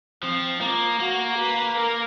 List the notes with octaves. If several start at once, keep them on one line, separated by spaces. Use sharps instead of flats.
F3 C4
A#3 F4
A#3 F#4
B4
A#4